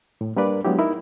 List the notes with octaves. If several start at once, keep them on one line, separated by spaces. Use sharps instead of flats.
A2
G3 A#3 D4 A#4 B4 D5
F#3 G#3 B3 D4 E4 G4
D#4 E4 A#4